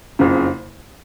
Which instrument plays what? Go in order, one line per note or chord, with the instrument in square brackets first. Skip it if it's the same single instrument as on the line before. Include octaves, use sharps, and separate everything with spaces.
[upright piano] F#1 F2 C#3